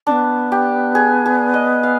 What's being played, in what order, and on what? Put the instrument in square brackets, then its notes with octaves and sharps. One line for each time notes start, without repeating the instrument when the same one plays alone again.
[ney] C#4 [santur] D4
[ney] B3
[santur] G4
G#4
G#4
D#5
F5